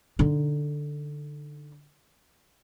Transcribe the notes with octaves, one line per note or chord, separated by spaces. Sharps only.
D3 D#4